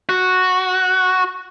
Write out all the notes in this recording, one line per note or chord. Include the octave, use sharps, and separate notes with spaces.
F#4